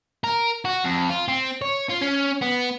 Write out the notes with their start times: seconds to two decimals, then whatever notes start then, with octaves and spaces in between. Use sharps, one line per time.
0.24 A#4
0.65 F#4
0.85 F2
1.10 F4
1.28 C4
1.62 C#5
1.90 F4
2.02 C#4
2.41 B3